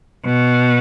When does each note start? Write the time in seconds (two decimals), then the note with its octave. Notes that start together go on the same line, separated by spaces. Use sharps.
0.25 B2